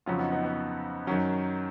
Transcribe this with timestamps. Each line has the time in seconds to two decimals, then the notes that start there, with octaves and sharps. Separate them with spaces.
0.06 F2 C#3 F#3 C#4 F4
0.19 B3 D#4
0.32 B3 D#4
0.44 B3
1.07 F#2 D#3 F#3 C#4